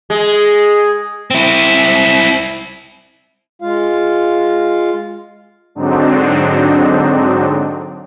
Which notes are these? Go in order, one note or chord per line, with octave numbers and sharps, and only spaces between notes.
G#3
C4 E4
G#3 F4 F5
G#2 D3 F#3 C4 D4 D#4